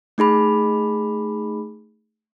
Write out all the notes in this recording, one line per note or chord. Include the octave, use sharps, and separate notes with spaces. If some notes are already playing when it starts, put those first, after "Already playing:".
A3 D#4 G#4 B5